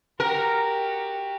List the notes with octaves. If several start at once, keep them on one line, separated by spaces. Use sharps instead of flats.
F#4 G4 A#4